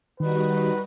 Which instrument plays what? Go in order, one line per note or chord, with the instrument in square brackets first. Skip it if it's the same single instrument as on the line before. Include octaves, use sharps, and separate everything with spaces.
[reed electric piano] D#3 [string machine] G3 D#4 F#4 [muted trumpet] B4